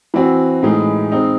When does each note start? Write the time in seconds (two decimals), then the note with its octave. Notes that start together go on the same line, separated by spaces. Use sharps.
0.14 E3 C4 F#4
0.62 A2 E3 G#3 D#4 G#4
1.12 G#3 C4 D#4